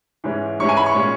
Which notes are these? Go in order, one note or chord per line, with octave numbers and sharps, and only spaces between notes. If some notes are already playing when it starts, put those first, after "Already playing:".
G#2 E3 G#3 C#4
G#2 E3 G#3 C#4 C#6
G#5
B5
C#6
A#2 G#3 C#4